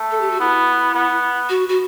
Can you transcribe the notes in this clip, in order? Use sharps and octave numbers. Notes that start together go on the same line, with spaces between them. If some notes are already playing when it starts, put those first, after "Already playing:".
Already playing: A3
A4
G4
F#4
B3 E4
B3
F#4
F#4